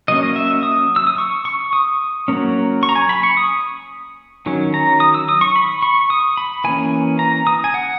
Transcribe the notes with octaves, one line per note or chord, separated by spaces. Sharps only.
F#3 A#3 C#4 D#5
D#5
E5
D#6
E6
D#6
C#6
C#6
D#6
F#3 A#3 C#4
C#6
A#5
G#5
B5
C#6
D#6
D#3 F#3 C#4
A#5
D#6
E6
D#6
C#6
B5
C#6
D#6
B5
E3 A#3 C#4 G#5
A#5
D#6
G#5
F#5